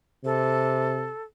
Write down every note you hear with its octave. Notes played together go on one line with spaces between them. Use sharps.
C3 A4